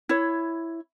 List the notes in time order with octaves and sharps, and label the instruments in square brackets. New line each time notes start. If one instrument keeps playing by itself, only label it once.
[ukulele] E4 C#5